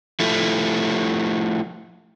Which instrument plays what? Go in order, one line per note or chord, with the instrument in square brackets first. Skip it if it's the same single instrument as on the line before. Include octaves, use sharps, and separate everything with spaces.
[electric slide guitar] F3 A3 E4